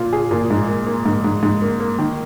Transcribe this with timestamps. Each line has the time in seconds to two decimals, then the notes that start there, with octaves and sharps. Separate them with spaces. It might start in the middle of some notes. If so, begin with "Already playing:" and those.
Already playing: A#2 F4
0.13 G#4
0.31 A#2
0.50 G#2
0.68 A#3
0.87 A#3
1.06 G#2
1.25 G#2
1.43 G#2
1.62 A#3
1.80 A#3
1.99 D#3